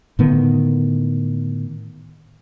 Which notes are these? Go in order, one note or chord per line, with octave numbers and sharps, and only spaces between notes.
A2 D3 D#3 B3